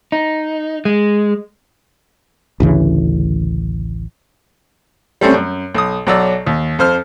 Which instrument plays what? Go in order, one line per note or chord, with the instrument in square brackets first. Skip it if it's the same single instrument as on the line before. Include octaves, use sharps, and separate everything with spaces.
[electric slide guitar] D#4
G#3
[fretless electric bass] A1 D2 C#3 E3
[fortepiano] G3 A3 C4 C#4
F#2
B1 D#6
B1 F#3 D5 E6
D#2
F2 C5 F6